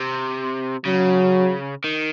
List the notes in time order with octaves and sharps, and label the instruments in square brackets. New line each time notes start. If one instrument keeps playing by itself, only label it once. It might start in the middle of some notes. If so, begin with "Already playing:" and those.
Already playing: [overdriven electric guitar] C3
[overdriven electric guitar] C#3 [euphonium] F#3
[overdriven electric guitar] D#3